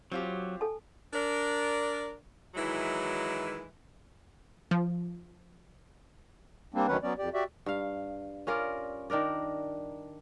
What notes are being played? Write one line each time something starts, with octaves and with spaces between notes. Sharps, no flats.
F#3 C4 F4 G4
A4 G#5 A5
D4 A#4
D#3 E3 F#3 G#3 E4
F3
G3 A#3 C4 D4
D2 D#3 F#3 C#4 B4 F#5
F#3 B3 C#4 D5
F2 G4 D5
F#4 G4 D5 E5
G2 F5
C#4 F4 A#4 D5
D#3 D4 A#4 D5